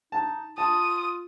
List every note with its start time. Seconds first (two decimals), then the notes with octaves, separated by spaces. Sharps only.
0.12 D#4 A5
0.58 F4 A5 D#6